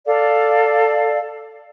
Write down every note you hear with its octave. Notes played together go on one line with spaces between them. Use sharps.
A4 D5 F5